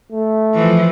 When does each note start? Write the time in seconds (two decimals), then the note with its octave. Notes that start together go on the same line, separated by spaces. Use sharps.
0.12 A3
0.54 E3 F3